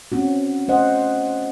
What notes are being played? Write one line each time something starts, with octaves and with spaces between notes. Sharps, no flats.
C4 C#4 F#4
A3 C#4 C5 D#5 F#5